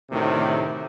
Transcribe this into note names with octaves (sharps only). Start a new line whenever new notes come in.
D2 A2 C3 D#3